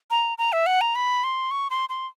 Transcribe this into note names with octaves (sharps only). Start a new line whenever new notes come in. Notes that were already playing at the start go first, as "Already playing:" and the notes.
A#5
A#5
E5
F#5
A#5
B5
C6
C#6
C6
C6